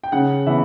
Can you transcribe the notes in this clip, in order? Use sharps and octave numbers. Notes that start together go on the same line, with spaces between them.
G5
C#3 F#5
E3 B3 E5